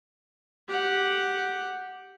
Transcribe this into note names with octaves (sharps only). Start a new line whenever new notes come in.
G4 F#5